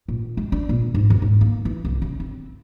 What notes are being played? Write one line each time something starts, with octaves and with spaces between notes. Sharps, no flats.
A#2
G#3
D4
A#2
G#2
F2
G#2
A#3
E3
C2
C#3
C4